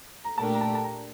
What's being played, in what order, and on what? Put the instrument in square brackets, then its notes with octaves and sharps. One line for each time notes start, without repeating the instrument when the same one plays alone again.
[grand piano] A#5
[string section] A#2 A3 D4 G4 A#4 [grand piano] A5
[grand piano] A#5
A5
A5
A#5